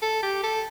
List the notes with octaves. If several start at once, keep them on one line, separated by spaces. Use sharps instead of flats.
A4
G4
A4